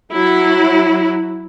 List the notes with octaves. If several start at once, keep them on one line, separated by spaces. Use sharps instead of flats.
F#3 E4